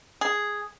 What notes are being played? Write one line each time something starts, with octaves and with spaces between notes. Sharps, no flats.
G#4